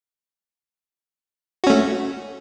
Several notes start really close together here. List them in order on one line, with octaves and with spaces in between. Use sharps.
F#4 C#4 A3